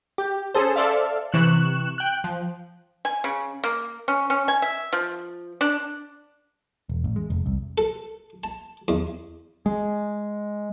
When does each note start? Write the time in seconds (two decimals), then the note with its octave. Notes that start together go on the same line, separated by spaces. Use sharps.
0.18 G4
0.54 C#4 G#4 A4 C5
0.76 A4 C5 D5 E5 F5
1.32 C3 E3 C#6 F#6 E7
1.98 G5 F#6
2.24 F3
3.05 G#5
3.24 C#3
3.64 A#3
4.08 C#4
4.30 C#4
4.48 G#5
4.62 E5
4.93 F3
5.61 D4
6.89 E1
7.04 A1
7.16 G#3
7.30 F1
7.46 C2
7.78 A4
8.44 A5
8.88 E2
9.66 G#3